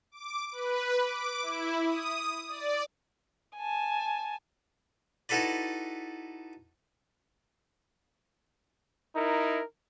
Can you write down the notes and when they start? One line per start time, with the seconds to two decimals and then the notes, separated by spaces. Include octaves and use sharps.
0.12 D6
0.52 B4
1.02 D6
1.42 E4
1.85 D#6
2.48 D5
3.57 G#5 A5
5.29 D#4 E4 F#4 A4 B4 D5
9.16 D#4 E4 A#4